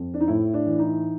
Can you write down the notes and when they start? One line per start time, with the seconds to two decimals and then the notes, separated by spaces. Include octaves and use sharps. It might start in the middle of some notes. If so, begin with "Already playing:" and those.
Already playing: F2
0.14 D4
0.21 D#4
0.28 A2 E4
0.54 D4
0.66 E3
0.79 D#4